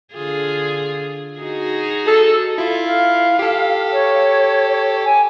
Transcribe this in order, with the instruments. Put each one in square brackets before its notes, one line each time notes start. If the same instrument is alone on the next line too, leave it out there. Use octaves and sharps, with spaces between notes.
[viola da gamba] D3 F4 G#4
D#4 F#4 G#4
[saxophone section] A4
[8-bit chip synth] E4 F4
[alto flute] F5
[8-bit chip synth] G4 A4
[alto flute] C#5
G#5